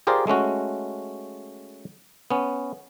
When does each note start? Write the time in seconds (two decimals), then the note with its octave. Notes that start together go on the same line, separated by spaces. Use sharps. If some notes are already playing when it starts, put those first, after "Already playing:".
0.07 F4 G4 G#4 A#4 C5 D5
0.27 G#3 A3 C#4 F#4
2.31 B3 C#4